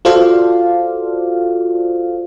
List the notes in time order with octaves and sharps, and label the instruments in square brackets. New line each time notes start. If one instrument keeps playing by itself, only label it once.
[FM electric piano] F4 F#4 A4 C5 D5 F5